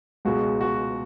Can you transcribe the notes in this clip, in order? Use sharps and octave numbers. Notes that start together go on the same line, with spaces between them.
C#2 B2 G#3 F#4
F#4